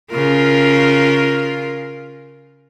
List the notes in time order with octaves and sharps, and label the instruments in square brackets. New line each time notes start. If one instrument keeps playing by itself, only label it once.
[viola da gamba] C#3 F4 A#4